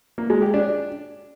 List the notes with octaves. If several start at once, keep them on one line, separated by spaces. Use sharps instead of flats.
A#3
G#3
G4
D4